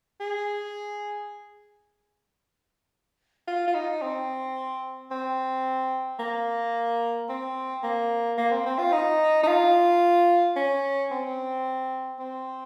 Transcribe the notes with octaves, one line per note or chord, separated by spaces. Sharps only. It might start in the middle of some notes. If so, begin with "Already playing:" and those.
G#4
F4
F4
D#4
C4
C4
A#3
C4
A#3
A#3
C4
C4
F4
D#4
D#4
F4
C#4
C4
C4